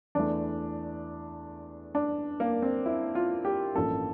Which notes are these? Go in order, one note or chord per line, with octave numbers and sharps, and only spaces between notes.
E2 E3 A3 D4
D4
A#3
C4
E4
F4
G4
A1 G2 F3 A#3 A4